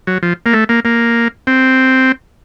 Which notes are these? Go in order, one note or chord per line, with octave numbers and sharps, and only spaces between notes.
F#3
F3
A#3
A3
A#3
A#3
C4